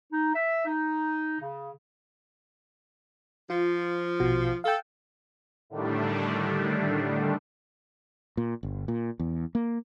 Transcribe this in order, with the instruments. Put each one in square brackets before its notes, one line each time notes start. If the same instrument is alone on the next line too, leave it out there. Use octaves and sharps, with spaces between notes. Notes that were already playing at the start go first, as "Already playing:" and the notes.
[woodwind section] D#4
E5
D#4
C#3
[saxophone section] F3 [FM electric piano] F4
[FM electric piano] A#1 B2 F#4
[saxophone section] A4 [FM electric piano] F5 G5
[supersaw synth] A2 D3 D#3 G3 A3 D4
[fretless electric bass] A#2
G1
A#2
E2
A#3